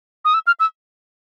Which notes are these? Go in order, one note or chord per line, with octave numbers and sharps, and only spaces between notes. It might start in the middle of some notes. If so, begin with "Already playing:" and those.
D#6
E6
F6
E6